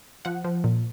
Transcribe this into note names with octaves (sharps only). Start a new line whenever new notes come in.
F3 F#5
F3
A#2